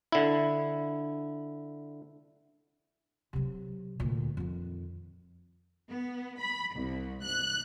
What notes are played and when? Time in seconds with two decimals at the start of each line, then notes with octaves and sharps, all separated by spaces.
0.12 D3 E4
3.33 C3 F#3
4.00 D2 A#2
4.37 F2 D#3
5.89 B3
6.40 B5
6.76 C2
7.24 F#6